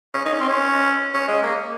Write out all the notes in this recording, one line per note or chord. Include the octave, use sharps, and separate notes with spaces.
C#4
D#4
C#4
C4
C#4
C#4
G#3
A#3